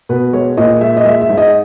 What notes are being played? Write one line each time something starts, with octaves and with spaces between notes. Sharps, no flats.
B2 B4
G#3 C#5
A#2 D#5
G#3 E5
D#5
G#3 E5
E5
G#2
D#5